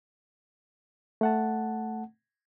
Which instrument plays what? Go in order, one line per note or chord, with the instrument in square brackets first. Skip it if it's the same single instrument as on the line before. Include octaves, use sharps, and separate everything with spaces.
[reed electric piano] A3 F#5 A5